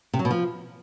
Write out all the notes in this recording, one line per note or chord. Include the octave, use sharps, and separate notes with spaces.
C3
F#3
B2
F3